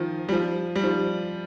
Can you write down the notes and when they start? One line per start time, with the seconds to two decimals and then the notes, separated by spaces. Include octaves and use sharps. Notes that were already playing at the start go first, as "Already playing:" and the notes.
Already playing: D#3 F3
0.29 G3
0.32 F3
0.76 G3
0.84 F3